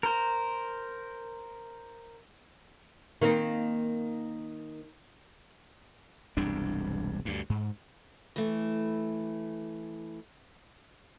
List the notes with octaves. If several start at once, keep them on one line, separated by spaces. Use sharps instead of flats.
A#4 C5
D#3 A#3 C4
E1 C2 G2 D4
D2 G2
G#2
E3 A3